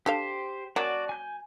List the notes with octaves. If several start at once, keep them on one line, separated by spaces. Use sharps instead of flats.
D4 G4 A4 C5 F5
F#3 A#3 C#4 F#4 D5 A5
G#5 G6